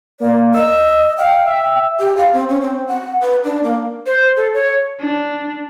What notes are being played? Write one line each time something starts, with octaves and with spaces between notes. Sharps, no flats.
A#3 D5
D#5 E6
F5 G5
E5
G4
F5
C4
C#4
C4
F#5
B4
D4
A#3
C5
A4
C#5
D4